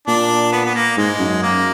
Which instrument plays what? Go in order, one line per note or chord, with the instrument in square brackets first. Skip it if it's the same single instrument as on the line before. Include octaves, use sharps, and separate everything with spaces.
[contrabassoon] A#2 [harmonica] D4
[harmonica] B3
B3
A#3
[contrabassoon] G#2 [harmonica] G#3
[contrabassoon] F#2
[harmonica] A#3